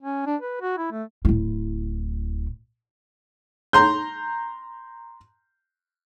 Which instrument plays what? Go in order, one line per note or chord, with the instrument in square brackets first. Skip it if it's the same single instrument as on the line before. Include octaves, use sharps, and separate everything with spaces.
[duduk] C#4
D4
B4
F#4
E4
A3
[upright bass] D1 E4
[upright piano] A#5 C6 G6